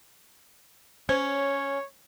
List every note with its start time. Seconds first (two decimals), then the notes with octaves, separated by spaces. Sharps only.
1.09 C#4 C5 C#5